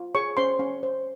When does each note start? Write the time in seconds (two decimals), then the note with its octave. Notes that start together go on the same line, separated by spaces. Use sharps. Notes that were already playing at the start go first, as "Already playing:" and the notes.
Already playing: F4
0.15 G#4 C#5 C#6
0.37 C#4 C5 C6
0.59 C#4
0.83 C5